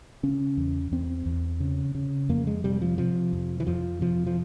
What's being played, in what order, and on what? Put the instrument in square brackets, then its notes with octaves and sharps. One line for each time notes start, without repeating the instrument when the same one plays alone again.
[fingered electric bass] C#3 C#4
E2
E2 C4
E2
C#3
C#3
F2 A#3
G#3
C3 G3
F3
C3 F3
F2
E3
F2 F3
C3 F3
F3